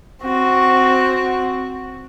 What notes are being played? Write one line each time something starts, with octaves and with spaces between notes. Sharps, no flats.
C4 F#4